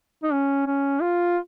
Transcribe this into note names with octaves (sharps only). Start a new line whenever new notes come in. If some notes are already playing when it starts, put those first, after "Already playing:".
D#4
C#4
C#4
F4